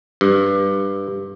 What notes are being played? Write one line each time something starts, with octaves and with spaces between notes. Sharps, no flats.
G2